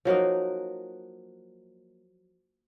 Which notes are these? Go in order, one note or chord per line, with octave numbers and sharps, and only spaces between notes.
F3 F#3 A#3 D#4